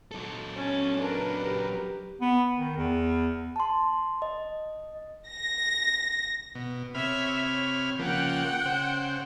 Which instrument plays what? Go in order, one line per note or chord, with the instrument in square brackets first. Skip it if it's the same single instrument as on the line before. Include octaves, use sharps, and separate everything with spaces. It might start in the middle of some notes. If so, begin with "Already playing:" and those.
[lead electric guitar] F#3 A4
[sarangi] C#4 [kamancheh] A5
[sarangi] D4 [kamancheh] A#4 B4
[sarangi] G4
[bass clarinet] B3
D#3
E2
[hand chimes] A5 C6
D#5
[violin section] A#6
[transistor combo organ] B2
[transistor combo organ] C3 B5 F6 [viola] C#5 E5
[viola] C#5
[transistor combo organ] C#3 F3 A#3 [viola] F#5 G5
[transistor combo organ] C#3 C5